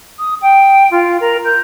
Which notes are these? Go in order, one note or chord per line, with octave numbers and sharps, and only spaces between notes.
D#6
G5
F4
A#4
G6